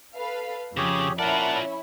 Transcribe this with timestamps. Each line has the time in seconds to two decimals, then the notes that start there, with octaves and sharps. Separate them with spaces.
0.14 A4 B4 F5
0.77 F2 C#3 G4 G#4 C#5
1.19 C#4 E4 F4 A#4 D5 F#5 A5